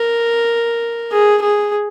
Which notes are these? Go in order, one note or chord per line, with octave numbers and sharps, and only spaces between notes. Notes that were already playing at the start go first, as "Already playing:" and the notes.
Already playing: A#4
G#4
G#4